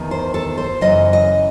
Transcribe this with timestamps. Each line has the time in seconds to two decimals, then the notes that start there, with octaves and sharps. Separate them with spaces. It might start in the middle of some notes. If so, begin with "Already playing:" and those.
Already playing: E2 D#3
0.11 C5
0.34 A4
0.58 C5
0.81 F#2 C#3 E3 D#5
1.13 D#5